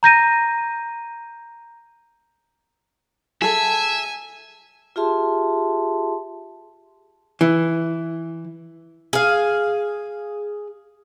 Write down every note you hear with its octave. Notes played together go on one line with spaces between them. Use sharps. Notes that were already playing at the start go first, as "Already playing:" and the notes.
A#5 G6 A#6 D#7
G#4 A4 E5 G#5
F4 G4 G#4 E5 A5 C6
E3
G#4 F5